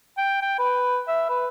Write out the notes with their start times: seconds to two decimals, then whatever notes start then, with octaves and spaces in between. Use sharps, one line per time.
0.18 G5
0.42 G5
0.59 B4
1.08 E5
1.30 B4